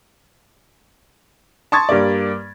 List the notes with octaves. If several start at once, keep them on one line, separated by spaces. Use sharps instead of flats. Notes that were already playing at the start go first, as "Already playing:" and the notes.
A5 C6 C#6 D#6 G#6 A6
G2 G3 A#3 D5